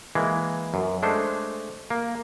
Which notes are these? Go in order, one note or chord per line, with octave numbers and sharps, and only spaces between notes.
E3 G#3 A#3
F#2
G#3 A3 D4 C5
A#3